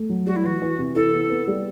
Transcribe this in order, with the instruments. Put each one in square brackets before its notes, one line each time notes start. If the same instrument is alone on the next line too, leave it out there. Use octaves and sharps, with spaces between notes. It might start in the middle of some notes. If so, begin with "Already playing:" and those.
Already playing: [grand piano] A3
F#3
[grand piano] G3 [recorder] F#4
[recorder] E4
[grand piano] E3 [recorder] F#4
[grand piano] E3
C3
[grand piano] E4 [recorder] A4
[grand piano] B3
B3
G3